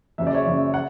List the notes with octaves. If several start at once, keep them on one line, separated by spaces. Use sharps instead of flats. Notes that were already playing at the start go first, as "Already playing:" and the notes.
F#1 F#2 C#3 E5
D5
C#5 E5
F#1 F#2 C#3
F#5